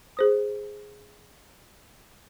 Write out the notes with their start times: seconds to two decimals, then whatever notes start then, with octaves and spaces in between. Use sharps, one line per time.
0.17 G#4 C5 D#6